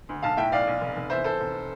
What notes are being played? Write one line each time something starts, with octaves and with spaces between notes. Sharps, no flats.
D2
B1 F5 A5
A2 E5 G5
B1 D5 F5
B1
F1
F1
E2 C5 E5
E2 A4 C5
F1